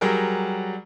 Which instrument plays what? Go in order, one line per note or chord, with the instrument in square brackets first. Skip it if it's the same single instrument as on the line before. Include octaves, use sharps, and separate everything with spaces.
[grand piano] F#3 G3 G#4 A#4